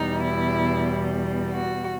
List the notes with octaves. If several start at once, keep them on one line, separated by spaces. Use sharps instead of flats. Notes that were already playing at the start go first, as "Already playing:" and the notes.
Already playing: E2 B2 G3 D#4
E4
F#4